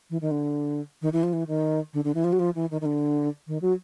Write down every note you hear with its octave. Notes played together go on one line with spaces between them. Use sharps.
E3
D#3
D3
D#3
E3
F3
E3
D#3
D3
D3
E3
F3
F#3
F3
E3
D#3
D#3
D3
D#3
F#3